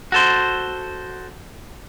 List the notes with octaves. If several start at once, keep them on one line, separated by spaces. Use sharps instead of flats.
F#4 A4 C5